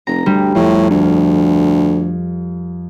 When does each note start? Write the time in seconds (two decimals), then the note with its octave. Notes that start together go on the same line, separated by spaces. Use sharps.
0.07 F1 A#5
0.26 D2 G3
0.55 F2 A2
0.90 D2